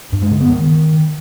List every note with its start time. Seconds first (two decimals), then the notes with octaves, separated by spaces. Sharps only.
0.12 G2
0.22 G#3
0.31 C#3
0.41 B3
0.50 D#3